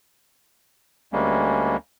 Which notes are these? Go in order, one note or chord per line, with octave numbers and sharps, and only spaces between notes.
D2 G3 G#3 A#3 C#4